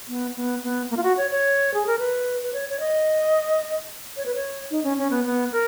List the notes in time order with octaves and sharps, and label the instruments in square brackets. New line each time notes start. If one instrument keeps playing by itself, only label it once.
[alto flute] B3
B3
B3
A#3
F4
F#4
C#5
C#5
G#4
A#4
B4
B4
C#5
C#5
D#5
C#5
B4
C#5
D#4
C#4
C#4
B3
B3
A#4